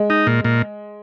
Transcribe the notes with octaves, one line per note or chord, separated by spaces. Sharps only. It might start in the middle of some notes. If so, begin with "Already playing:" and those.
Already playing: G#3
D#4
A#2
A#2